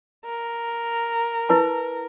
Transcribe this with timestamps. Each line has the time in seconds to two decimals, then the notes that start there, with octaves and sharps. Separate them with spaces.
0.25 A#4
1.49 E4 B4 A5